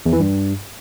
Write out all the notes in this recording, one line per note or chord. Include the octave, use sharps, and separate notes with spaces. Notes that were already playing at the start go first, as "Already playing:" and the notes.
E2
E3
G2